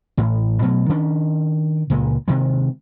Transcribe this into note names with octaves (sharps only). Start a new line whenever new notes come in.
A1 A2
B2 F#3 A3
D#3 C#4 D4
C#2 A#2 G#3
C3 D#3 G#3